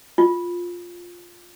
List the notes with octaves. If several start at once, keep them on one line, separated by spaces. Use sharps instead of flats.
F4